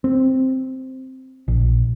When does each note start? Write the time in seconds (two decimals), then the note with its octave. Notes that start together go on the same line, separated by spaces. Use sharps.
0.04 C4
1.48 A#1